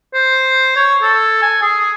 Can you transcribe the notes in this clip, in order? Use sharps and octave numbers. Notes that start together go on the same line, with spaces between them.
C5
C#5
A4
G#5
G#4